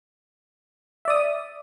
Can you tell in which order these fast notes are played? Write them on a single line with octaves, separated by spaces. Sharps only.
E5 D5 D#6